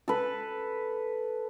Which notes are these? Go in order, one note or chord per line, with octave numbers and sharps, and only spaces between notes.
A4 B4